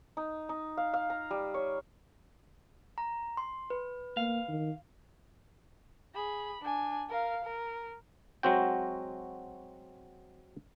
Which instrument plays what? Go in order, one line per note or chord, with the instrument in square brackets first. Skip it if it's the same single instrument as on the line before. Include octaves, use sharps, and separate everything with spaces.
[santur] D#4
D#4
F5
F5
A#5
G3
C#5
[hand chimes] A#5
C6
B4
[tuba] A#3 [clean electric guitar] F5
[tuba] D#3
[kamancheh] G#4 B5
D4 G#5
A#4 F5
A#4
[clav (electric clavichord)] F#3 G#3 C4 F#4 G5